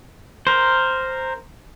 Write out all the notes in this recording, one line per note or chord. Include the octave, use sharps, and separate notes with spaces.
A#4 C5